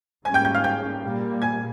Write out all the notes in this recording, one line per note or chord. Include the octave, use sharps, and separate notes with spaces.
G#2 G3 A#3 C#4 G#5 G#6
G5 G6
G5 G6
F5 F6
G5 G6
A#2 G3 A#3
G#5 G#6